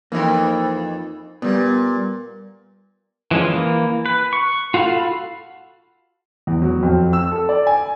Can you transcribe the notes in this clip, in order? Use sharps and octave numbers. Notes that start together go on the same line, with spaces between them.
F2 E3 A#3 D#4 A#4
A#2 G3 B3
E3 F3 G#3 C#4
E3 A#3
B4
C#6
F4 F#4 A4 F5 B5
E2
F#3
F2
E6
A4
D5
G#5